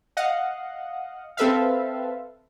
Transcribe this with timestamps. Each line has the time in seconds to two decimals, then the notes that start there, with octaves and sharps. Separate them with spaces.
0.17 D#5 F5 F#5
1.37 C4 A4 B4 E5 F5